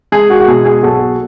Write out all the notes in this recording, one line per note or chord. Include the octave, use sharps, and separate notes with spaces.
G#3 G#4
F#4
F#4
B2 G#4
G#4
B1 F#4 A4